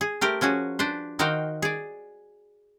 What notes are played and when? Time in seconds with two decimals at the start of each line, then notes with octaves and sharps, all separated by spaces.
0.01 G#4
0.21 A3 G4 A#4 C5
0.41 F3 C#4 F#4 G#4
0.79 D4 B4 C5
1.19 D#3 D#4 F#4 C5 F5 G5
1.62 G#4 D5